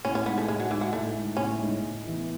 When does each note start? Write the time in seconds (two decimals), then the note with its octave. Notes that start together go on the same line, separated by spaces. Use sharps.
0.04 A2 C#4
0.15 C#4
0.26 G#3 B3 D#4
0.38 A3
0.48 A2 G#3
0.60 F#3
0.71 E3 G#3 D#4
0.81 F#3
0.93 A2 A3
1.15 G#3 D#4
1.37 A2 C#4
1.60 G#3 D#4
1.81 A2
2.03 E3 B3 E4